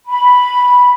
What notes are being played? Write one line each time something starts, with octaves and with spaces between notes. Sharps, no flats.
B5